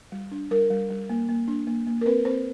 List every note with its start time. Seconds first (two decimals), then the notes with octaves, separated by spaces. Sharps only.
0.12 G3
0.31 D4
0.51 G3 A#4
0.70 G3
0.90 G3
1.09 A#3
1.29 A#3
1.48 D4
1.67 A#3
1.87 A#3
2.01 A#4
2.06 C4 B4
2.25 C4 C5